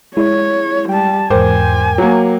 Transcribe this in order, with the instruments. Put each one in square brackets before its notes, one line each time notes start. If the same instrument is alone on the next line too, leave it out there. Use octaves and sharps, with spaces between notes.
[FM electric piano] G#3 [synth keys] E4 [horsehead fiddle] C#5
[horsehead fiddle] G3 A5 [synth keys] G5
[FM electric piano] E2 G#2 [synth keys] A#4 G5 D6 [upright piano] C5 [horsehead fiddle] G#5
[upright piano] F#3 A#3